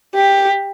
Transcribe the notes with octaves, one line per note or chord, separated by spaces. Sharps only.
G4